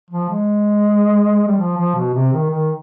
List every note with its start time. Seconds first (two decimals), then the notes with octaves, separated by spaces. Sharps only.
0.11 F3
0.30 G#3
1.48 G3
1.58 F3
1.78 F3
1.95 B2
2.14 C3
2.33 D#3
2.51 D#3